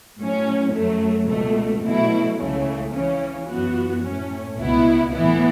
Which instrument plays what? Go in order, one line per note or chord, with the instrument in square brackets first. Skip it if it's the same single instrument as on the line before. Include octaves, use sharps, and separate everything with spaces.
[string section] A2 F#3 C#4
F#2 F#3 A3
C#2 B2 A3
B2 F#3 A3 E4
C#2 C#3 E3 A3
C#3 E3 C#4
F#2 E3 B3 F#4
A2 A3 C#4
C#2 B2 B3 E4
A2 E3 B3 E4